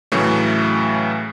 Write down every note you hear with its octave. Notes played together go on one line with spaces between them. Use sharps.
A2 C#3 E3 F#3 A3